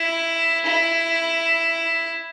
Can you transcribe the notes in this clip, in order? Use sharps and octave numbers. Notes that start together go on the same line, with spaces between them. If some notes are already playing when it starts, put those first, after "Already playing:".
Already playing: E4
E4